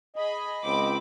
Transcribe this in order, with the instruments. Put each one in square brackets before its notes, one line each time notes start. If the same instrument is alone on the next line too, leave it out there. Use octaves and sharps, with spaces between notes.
[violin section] G#4 B5 [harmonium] D#5
[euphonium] C#2 [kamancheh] C4 B5 [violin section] D6